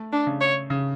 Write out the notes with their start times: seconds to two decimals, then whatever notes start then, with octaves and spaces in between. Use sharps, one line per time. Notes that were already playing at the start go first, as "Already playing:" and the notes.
Already playing: A3
0.13 D4
0.27 C#3
0.41 C#5
0.70 C#3